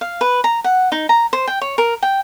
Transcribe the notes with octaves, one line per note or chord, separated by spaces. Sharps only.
F5
B4
A#5
F#5
D#4
A#5
C5
G5
C#5
A#4
G5